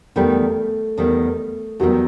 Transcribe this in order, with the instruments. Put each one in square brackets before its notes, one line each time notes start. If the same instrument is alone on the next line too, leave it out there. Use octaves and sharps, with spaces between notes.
[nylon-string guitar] E2 D#3 G3 B3 [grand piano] A3
[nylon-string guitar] E2 D#3 G3 B3
[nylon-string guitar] E2 D#3 G3 B3 [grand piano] F#3